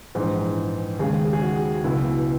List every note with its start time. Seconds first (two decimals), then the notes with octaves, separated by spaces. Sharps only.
0.15 A#1 G#2 E3
0.99 D#2 C#3 G#3 G#4
1.33 G#4
1.42 F#4
1.84 C#2 B2 F#3 E4